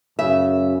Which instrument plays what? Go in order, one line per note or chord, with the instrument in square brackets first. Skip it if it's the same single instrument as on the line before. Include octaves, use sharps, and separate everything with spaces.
[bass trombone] F#2 [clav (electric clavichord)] C#3 [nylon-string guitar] E5